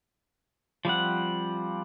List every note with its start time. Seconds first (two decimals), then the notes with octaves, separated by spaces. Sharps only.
0.85 F3 G3 C4 F#5